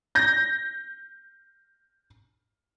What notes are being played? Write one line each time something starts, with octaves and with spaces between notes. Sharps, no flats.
G6 A#6